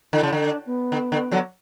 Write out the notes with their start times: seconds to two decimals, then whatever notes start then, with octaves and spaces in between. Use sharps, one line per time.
0.13 D3 E4
0.23 C#3
0.33 D3
0.39 D4
0.66 B3
0.92 D3
1.12 D3
1.31 D3 F#3